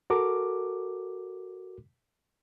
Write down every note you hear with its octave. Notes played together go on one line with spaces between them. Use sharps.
F#4 A4 A#4 D6